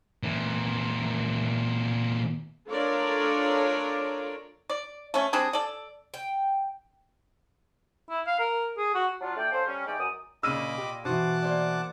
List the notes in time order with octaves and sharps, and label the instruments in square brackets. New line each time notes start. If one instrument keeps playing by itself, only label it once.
[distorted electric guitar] A#2 E3
[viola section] D4 F4 A4 A#4 C#5 D5
[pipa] D5
A3 C#4
G3 C4 D4 G#4
A4 D5
[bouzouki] G5
[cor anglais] E4
F5
A#4
G#4
F#4
[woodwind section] F#3 D4 F4
A3 D4 A4 D5 G5
C#4 F4 A4 C5
G3 C#4
E2 G#3 D#4 D5 G5
F#2 D#6
[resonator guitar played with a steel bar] A#2 C#3 A#3 [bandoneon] D#5 B5 D6 [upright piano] E6 D#7
[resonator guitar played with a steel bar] A#2 F4 G4
[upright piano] B2 E3 [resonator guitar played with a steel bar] C5 [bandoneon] F#5 A5 D6
[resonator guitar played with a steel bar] A#3 C5 D5